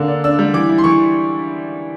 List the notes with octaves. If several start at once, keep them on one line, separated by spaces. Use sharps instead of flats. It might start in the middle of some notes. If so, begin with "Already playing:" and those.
Already playing: D3 A#3 E6
D4
D4 E6
G3
E3 D6
E4
C6
E3 C#6